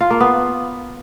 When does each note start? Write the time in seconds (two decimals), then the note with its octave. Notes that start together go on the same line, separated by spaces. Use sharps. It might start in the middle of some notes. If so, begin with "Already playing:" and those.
0.01 F4
0.11 A#3
0.20 B3